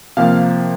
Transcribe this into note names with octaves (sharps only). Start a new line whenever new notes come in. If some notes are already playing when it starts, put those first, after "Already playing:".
C3 F3 A#3 F5